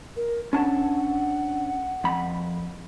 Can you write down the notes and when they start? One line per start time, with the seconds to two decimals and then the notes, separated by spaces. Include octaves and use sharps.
0.16 A#4
0.53 C#4 D4 F#5 A5
2.04 F2 B5